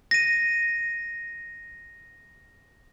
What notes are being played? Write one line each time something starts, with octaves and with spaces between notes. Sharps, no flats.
A#6 D#7